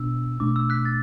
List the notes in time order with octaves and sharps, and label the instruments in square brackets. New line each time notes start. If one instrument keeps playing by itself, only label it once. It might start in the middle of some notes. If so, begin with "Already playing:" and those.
Already playing: [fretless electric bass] B2 B3 D4 [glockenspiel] E6
[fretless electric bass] B2 A3 D4 [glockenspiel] D6
[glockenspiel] E6
F#6 B6
E6 A6